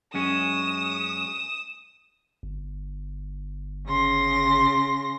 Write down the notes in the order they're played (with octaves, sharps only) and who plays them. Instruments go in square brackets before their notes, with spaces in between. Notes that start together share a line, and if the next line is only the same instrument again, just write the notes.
[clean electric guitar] F#2 G#3 C#4 [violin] D#6 E7
[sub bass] G1
[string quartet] C#3 C6 A#6